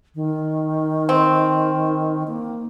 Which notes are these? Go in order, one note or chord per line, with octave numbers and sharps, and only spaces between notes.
D#3
C4
A#3